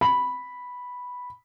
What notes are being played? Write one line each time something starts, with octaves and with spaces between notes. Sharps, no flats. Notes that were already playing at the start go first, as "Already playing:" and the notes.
B5